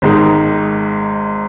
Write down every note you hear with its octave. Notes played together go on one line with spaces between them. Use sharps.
G#1 G#2 D#3 G#3 D#4